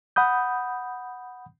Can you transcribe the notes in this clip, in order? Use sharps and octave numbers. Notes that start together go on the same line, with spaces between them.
F#5 B5 D#6 G6